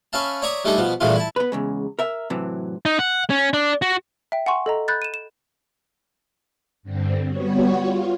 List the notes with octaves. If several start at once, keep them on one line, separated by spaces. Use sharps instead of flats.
C#4 B4 E5 F5 A5
C#5 D5 E5 A#5 C#6 D#6
G3 A3 D4 D#4 G#4 A4
B2 F3 B3
G2 A#2 E3 G#3 A3 F4
E4 A5
B3 B4
E2 C#3 G#3
A#4 E5
A2 C3 E3 F#3
D#4
F#5
C#4
D4
F#4
E5 G5
F#5 G#5 C6 C#6
A4 D#5 A#5
B5 F#6 G6 A6
D#7 E7
E7
G2 D3 C4
G3 B3 F#4 C#5
F4